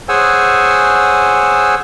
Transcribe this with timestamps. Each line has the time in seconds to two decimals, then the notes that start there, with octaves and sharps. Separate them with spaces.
0.09 G#4 C5 C#5 F#5 G#5 E6